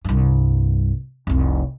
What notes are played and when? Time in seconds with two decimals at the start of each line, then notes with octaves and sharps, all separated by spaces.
0.05 C2 G2
1.27 F1 C2